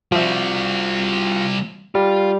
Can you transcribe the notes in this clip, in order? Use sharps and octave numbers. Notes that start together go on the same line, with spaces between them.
F3 G3 C4 F4 F#4 E5
G3 F4